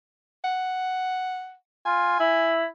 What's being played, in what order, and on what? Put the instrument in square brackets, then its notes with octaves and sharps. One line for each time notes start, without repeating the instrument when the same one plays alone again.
[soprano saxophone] F#5
[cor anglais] F4 [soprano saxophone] G#5
[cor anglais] E4